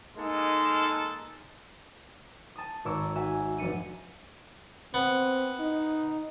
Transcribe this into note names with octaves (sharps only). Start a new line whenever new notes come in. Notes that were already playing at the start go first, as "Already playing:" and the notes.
G#3 A#3 D#4 A4
A5 D#6
G#1 A#4 C#5 D6 E6
F#4 E5 G#5
F1 D4 C#7 D#7
B3 C4
D#4